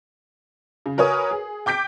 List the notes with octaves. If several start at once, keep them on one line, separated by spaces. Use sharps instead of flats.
C#3
F#4 A#4 B4 C#5 G#5 D#6
G#4
G5 D6 G6 B6 D7